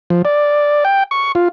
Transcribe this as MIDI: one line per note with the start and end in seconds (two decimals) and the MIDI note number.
0.10 0.22 53
0.25 0.84 74
0.85 1.03 79
1.11 1.32 85
1.35 1.48 65